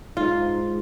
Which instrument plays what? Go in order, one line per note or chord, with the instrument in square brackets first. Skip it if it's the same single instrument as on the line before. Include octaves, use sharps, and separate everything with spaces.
[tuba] G#2 [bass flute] D#4 [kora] F4